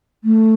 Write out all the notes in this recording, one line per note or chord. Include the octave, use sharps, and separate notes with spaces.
A3